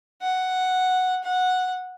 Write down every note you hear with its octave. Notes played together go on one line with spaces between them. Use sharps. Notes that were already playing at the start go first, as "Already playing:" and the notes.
F#5
F#5